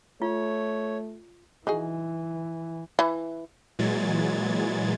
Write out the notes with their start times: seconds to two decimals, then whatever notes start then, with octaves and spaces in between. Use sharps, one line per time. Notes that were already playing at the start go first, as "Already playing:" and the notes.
0.22 A3 F4 C#5
1.67 E3 D#4 F#4 G#4
2.99 E3
3.79 A#2 E3 F#3 G#3 G#6 A6